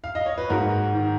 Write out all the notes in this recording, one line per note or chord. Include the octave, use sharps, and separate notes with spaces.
F5
D#5
C#5
B4
G#2 F#4 A#4
D#3